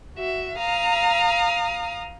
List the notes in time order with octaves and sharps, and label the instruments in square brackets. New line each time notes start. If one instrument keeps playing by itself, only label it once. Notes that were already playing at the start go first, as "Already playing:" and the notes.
[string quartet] F#4 E5
F5 A#5 D#6